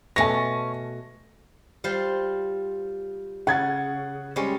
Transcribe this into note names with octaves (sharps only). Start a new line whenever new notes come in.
B2 A3 C#4 G#5 A5 A#6
G3 F4 C5
C#3 F#5 G#6 A6
G3 G#3 C#4